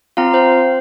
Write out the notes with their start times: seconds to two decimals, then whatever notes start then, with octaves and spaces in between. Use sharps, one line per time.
0.17 C4 F4 F5 A#5
0.34 C5 F5
0.52 C5